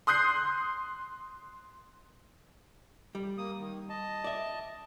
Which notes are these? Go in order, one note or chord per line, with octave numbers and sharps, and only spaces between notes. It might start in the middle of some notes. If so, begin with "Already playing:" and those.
C6 D#6 F#6 G6 C7
G3
A#3 D#6
D#3
D#5 A5
D5 E5